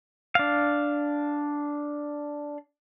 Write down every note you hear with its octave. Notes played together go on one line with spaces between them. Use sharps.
D4 F5